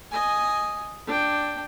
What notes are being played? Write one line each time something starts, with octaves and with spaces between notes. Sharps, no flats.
D#5 G#5
D4 G5